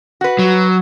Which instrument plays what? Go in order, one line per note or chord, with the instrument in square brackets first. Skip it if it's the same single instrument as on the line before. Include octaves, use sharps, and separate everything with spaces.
[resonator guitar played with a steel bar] F#4 B4
[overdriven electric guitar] F#3